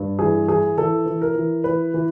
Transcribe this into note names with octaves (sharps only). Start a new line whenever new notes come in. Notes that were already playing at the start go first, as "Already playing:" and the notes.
Already playing: G2
E3 G#4
E3 G#4
E3 A4
E3
A#4
E3
E3 B4
E3